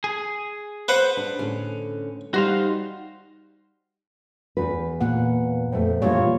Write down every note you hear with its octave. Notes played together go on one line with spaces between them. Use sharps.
G#4
B4 C5 F#5
D4
A2 D3 C#4
G3 D#4 F#4 C5 F5
E2 B4
A#2 A#3 F#5
F2 A3
A#2 D3 E3 G3 F4 C#5